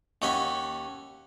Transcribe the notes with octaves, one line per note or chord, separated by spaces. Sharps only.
D#2 C#4 D#5 F#5 G#5 B5